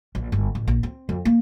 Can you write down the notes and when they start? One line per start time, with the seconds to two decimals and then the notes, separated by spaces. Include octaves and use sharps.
0.15 A#1
0.32 G1
0.55 A1
0.68 A#1
0.83 C4
1.09 F2
1.25 A#3